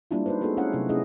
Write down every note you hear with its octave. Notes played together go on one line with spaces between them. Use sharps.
G3 G#3 A#3 D4 E4 F4
D#4 B4 C5
A3 B3 D#4 F#4 G#4 A4
C#4 E4 C#5 F5 F#5
C3 F#3 A3 E4 D#5
A3 C4 C#4 E4 G#4 D#5